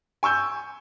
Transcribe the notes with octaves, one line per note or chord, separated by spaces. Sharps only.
G#5 C#6 E6 G6